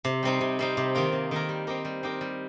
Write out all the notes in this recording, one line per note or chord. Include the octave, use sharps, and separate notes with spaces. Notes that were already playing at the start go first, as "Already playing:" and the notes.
C3
G3 C4 D#4
C3
G3 C4 D#4
C3
D#3 A#3 F4 A#4
C3
D#3 A#3 F4 A#4
G3
C4 D#4 G4 A#4
G3
C4 D#4 G4 A#4
G3